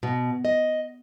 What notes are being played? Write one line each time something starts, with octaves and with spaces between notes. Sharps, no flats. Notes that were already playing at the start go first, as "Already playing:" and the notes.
B2
D#5